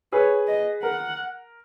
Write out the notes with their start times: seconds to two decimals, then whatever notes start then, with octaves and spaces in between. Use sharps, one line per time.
0.12 G#4 B4 C#5
0.48 D#5
0.83 A#4 F#5